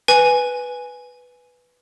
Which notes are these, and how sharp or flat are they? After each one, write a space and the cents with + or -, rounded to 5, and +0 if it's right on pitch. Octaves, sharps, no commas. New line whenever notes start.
B4 +0 G#5 +0